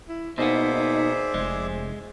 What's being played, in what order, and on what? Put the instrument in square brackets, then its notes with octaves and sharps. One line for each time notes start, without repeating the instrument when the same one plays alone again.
[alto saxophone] E4
[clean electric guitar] B2 A#3 B3 [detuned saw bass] D#4 [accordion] G#4 D5 E5 [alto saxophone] C5
[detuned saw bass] F1 [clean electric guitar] G#3